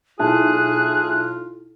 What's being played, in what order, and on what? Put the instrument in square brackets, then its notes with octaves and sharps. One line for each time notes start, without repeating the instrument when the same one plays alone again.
[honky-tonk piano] B1 E4 A5 [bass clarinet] F4 [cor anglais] G#4 [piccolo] F#6